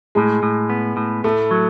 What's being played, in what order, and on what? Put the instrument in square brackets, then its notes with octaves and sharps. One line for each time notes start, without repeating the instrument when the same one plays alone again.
[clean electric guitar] A2 [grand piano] G#3
[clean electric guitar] A2
B3
A2
[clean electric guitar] A2 [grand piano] A3
[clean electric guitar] F#3